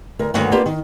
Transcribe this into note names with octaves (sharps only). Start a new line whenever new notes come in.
D2 A#4
D2 G2 D#3 A#3 C#5 F#5
A#3 B3 D4 F4 G4
D#3